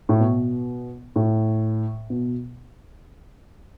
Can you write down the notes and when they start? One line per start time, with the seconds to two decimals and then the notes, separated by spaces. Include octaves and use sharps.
0.09 A2
0.20 B2
1.16 A2
2.10 B2